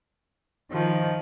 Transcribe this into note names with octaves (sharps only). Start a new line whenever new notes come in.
D#3 F3